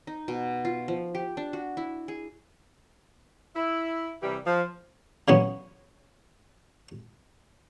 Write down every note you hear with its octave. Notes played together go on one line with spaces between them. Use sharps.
D#4
B2
F4
F3
G4
D4
F#4
E4
G#4
E4
C3 E3 G3
F3
C#3 E3 F#3 B3 C#4